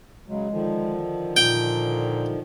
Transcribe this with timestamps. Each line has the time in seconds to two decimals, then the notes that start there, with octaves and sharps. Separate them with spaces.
0.28 C#3 F#3 G#3
0.51 D3 D#3 F3
1.37 A#2 G5